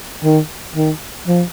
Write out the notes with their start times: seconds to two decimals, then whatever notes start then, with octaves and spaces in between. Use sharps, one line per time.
0.24 D#3
0.76 D#3
1.27 F3